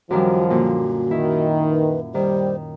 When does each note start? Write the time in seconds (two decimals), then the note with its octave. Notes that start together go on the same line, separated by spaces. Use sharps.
0.10 F#2 D#3 F3 G3 F#4
0.50 A#2 D3 F#4
1.11 D#3 E4
1.71 B4
2.15 D#3 G3 C5